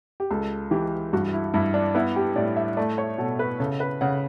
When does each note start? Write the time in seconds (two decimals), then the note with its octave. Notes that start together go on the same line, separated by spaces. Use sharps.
0.20 G4
0.31 C#2 A4
0.71 E3 G4
1.13 G2 F#4
1.33 E4
1.54 G2 E4
1.74 D4
1.95 B3 E4
2.16 G4
2.36 A2 D5
2.57 E5
2.77 A3 D5
2.98 C#5
3.18 B2 A4
3.39 B4
3.60 C#3 A4
3.80 B4
4.01 C#3 F#5